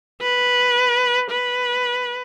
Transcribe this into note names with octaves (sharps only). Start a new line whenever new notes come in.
B4
B4